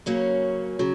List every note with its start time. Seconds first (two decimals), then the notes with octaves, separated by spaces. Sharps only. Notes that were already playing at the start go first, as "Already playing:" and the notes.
0.06 C#3 F#3 A#3 C#4
0.79 C#3 F#3